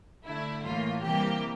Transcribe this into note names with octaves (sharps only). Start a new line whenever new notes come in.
D3 A3 E4
A2 E3 A#3 F4
C3 E3 G3 A#3 G4